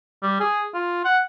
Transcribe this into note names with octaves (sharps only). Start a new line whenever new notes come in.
G3
G#4
F4
F#5